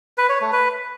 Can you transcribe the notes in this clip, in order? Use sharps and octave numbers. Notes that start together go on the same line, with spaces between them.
B4
C#5
A3
B4